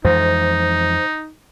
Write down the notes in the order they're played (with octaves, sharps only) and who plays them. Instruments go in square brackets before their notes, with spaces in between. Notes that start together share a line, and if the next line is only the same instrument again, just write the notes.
[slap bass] F2 E3 G#3 [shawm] D#4 [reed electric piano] C5